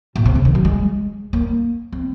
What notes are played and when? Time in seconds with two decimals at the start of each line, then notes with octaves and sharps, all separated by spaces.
0.16 A#2
0.25 C3
0.35 C#3
0.45 D#3
0.55 F#3
0.65 G#3
1.33 A#3
1.93 C4